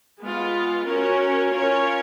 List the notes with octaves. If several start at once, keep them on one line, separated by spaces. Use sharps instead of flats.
G#3 B3 F4
C#4 F#4 A#4 C#5
C#4 F4 A#4 C#5